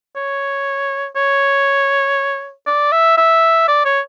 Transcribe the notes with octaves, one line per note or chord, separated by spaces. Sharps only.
C#5
C#5
D5
E5
E5
D5
C#5